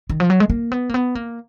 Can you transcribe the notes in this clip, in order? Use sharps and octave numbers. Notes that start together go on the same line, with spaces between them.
D#3
F3
F#3
G#3
A#3
B3
A#3
B3
A#3